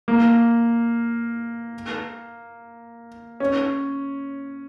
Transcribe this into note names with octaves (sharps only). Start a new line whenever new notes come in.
A#3
C#4